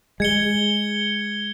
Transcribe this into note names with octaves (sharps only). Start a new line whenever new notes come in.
G#3 G#6 C#7 G7